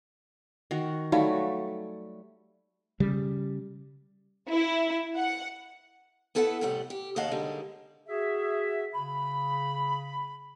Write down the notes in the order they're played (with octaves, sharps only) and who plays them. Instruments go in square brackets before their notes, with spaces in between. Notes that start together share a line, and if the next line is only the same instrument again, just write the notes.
[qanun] D#3 F#4
[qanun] F#3 G3 A3 [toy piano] D#4 F5 B5
[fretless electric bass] C#3 G3
[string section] E4
F#5
[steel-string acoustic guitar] B3 E4 A4 B4 D#5 F#5
F2 A2 C3 G3 F#5
G4
D#2 C#3 D#5 F5 F#5 A5
D3 D#3 G3 G#3
[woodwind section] F#4 G#4 E5
C#3 B5